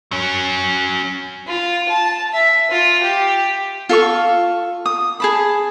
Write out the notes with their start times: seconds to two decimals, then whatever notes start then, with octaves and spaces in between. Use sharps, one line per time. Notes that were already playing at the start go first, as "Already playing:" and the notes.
0.11 F#3 C#4
1.47 F4
1.89 A5
2.33 E5
2.71 F4
3.03 G4
3.89 F4 A4 F5 C#6
4.86 D#6
5.20 G#4 A5 B5